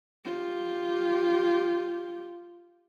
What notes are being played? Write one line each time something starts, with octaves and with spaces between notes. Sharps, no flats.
F4 G4